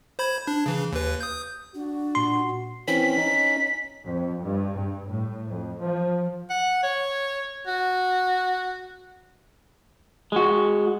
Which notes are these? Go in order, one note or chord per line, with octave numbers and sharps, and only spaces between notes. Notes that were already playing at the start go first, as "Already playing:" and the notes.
C5 B5 G#6
D4
C#3 E3
D#2 B4
D#6 G6
D4 F#4
A#2 C6
E3 C4 C#4 B6
C#4 D#4
F2
G2
G2
A2
F2
F3
F#5
C#5
F#4
G#3 F#4